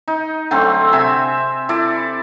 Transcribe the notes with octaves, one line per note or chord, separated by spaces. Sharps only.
D#4
D3 F#3 A3 C4
C3 E5 G#5
E4 A4 D5